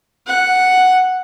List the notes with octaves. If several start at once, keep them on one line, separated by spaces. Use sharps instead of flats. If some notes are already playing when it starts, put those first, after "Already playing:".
F#5